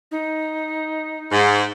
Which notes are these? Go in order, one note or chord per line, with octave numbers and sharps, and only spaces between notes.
D#4
G#2